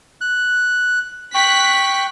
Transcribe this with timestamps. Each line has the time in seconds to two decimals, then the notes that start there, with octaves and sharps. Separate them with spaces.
0.21 F#6
1.35 G5 C#6 F#6 B6